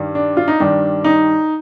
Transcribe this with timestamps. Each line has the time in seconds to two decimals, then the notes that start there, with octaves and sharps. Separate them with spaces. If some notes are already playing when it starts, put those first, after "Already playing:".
Already playing: G2 D#3 G3
0.15 D4
0.37 F4
0.48 D#4
0.60 G2 D#3 G3 D4
1.04 D#4